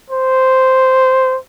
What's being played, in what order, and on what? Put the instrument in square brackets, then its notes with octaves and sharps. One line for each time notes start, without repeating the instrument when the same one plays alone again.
[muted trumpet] C5